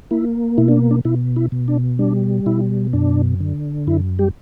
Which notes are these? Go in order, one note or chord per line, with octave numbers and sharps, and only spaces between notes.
A#3 E4
B2 E4
D4
D4
B2 E4
E4
B2
D4
G3 D4
B2 E4
F#2 D4
D3
F#2 E4
G3 G4